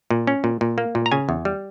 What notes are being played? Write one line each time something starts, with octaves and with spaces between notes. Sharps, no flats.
A#2
C#4
A#2
A#2
A#3
A#2
A#5
C#3 G#5
E2
G3